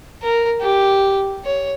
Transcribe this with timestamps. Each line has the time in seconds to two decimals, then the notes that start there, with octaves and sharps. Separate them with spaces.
0.23 A#4
0.61 G4
1.45 C#5